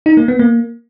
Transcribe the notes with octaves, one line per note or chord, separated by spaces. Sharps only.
D#4
A#3
B3
A#3